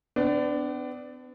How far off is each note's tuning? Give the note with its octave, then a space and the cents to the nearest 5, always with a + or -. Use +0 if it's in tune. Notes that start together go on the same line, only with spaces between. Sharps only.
B3 +40 D4 +0